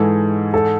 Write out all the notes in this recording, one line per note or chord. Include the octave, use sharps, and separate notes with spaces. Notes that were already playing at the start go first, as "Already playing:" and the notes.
Already playing: G#2 E3 G#3 A4
A4